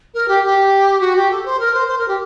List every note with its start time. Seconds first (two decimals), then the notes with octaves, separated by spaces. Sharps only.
0.14 A#4
0.28 G4
0.43 G4
1.00 F#4
1.16 G4
1.30 A4
1.45 C5
1.59 A#4
1.74 C5
1.88 C5
1.98 A#4
2.08 G4